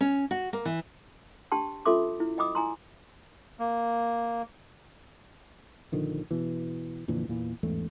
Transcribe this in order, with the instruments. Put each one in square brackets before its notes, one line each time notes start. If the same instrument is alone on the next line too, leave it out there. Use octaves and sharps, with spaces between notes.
[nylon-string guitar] C#4
F#4
A#3
E3
[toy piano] D4 G4 G5 A5 C6
C#4 F4 A4 E5 C6 D6
E4
D#5 G5 B5 D6 D#6
E4 G#5 A#5 C6
[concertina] A#3
[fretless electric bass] A#1 D3 D#3 F3
B2 E3
F2 A#2 D3 E3
E2 A#2 E3
A1 E2 G#2 A3